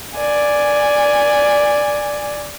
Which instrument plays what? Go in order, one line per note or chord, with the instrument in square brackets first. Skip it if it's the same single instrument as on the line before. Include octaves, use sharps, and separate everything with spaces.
[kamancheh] D5 G#5